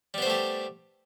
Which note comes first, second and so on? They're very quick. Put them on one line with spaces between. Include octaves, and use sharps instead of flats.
G3 B3 C5 A3 G4